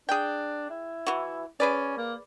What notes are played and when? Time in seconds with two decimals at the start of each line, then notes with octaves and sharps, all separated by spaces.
0.09 D4 G#4 G5
0.70 E4
1.07 E3 F#4
1.60 C#4 G#4 B4 D5
1.97 A#3